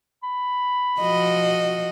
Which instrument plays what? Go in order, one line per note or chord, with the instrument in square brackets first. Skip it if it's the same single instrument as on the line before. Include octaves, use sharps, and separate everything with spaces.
[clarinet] B5
[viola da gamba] F3 F#4 D#5